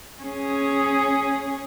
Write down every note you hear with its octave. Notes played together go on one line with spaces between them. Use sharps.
C#4 G#4